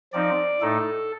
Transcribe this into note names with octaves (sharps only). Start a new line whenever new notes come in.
F3 C4 D#4 D5
A2 A3 D#4 A4